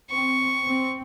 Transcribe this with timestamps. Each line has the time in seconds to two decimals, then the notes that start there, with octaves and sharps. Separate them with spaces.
0.10 C4 C#6
0.66 C4